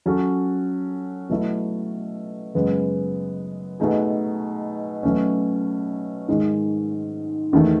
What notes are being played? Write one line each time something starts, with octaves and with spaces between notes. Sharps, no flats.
F#3 C#4 F#4 A4
B2 F#3 A3 E4 A4
F#2 C#3 G#3 B3
B2 A3 D#4 G#4
B2 F#3 A3 C#4
G#2 D#3 G#3
E2 D#3 A3